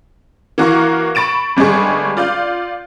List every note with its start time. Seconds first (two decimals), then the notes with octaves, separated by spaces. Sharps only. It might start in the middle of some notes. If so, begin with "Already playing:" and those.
0.58 E3 A#3 F#4 A#4 F5 C#6
1.15 B5 C#6 A6 D7 E7
1.57 G1 G3 G#3 G#4 C#6
2.17 F4 D5 F5 G6